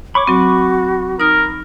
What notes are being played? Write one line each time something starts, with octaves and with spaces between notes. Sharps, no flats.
C#5 B5 C#6 D6
F#3 C4 F#4
D#4 A#4 D#6